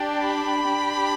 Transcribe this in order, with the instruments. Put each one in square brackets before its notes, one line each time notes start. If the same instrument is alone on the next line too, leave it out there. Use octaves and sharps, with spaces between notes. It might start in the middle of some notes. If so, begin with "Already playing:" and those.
Already playing: [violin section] D4 G4
B5
G4
D4